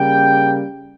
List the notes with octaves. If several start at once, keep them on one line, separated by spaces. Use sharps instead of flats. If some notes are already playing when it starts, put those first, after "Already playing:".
Already playing: C#3 G3 A#3 G5